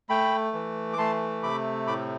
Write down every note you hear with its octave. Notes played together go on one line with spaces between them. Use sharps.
A3 G5 B5
E3
D6
A3 A5 C6
C3 B5 D6
A2 B5 D6